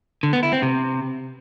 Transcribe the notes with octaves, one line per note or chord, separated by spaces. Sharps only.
D3
B3
E4
C4
C3